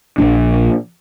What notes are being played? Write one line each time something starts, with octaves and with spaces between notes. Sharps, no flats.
A#1 A#2 A3 D4